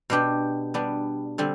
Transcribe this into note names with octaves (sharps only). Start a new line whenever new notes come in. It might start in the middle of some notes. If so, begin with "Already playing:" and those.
B2 B3 D4 G4
G3 B3 D4
D3 G3 C4